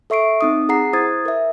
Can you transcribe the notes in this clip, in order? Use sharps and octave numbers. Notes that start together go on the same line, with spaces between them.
A4 E5 C#6 C7 D7
C4 D#4 D#6
G#4 F#5 A#5 C7
E4 C5 D#6 G#6 A6
A#4 E5